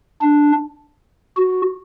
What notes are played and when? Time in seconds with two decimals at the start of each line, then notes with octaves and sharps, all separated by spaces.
0.22 D4
1.37 F#4